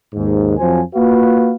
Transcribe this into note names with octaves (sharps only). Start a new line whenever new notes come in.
D#2 G#2
F2 F3 F#3 C5 G#5
A#3 F4 F#4 B4 F5